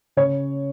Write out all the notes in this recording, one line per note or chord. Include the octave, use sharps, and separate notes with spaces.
C#3 C#5